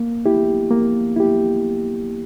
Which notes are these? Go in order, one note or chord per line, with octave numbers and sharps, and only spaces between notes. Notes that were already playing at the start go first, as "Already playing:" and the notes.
Already playing: A#3
E4 G4
A#3
E4 G4